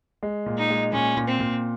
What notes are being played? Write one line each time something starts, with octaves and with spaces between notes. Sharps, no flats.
G#3
A#2
D#4
G#3
A#2 C#4
A#2
C4
A#2